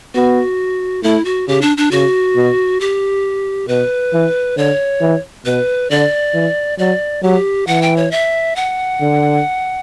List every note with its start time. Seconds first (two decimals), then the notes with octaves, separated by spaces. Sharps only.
0.14 B3 F#4
1.03 A3 E4
1.25 F#4
1.48 C#3 G4
1.62 D4
1.77 D4
1.91 C#3 F#4
2.36 B2
2.80 G4
3.68 B2 B4
4.13 E3
4.57 D3 C#5
5.01 E3
5.45 B2 B4
5.90 D3 D5
6.34 E3
6.79 F#3 D5
7.22 F#3 G4
7.67 E3 F#5
7.82 G5
7.97 C#5
8.11 E5
8.56 F#5
9.01 D3